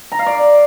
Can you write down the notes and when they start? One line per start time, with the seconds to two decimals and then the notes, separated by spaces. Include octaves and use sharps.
0.12 A#5
0.19 F5
0.27 D5